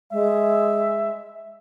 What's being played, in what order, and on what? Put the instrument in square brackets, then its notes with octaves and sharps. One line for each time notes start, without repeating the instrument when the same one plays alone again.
[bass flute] G#3 [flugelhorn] E5